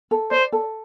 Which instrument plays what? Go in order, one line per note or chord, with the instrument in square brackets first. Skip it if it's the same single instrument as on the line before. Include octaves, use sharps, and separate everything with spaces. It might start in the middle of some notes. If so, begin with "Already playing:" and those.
[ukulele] A4
[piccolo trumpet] C5 [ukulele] D5
[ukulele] A4